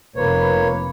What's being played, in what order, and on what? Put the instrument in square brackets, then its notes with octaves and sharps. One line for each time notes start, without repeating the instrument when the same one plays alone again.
[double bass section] F1 [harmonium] A#3 C#5 [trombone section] F4 B4